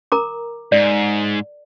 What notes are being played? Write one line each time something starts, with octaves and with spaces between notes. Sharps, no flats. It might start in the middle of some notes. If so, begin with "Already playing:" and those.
A#4 A#5 D6
G#2 D5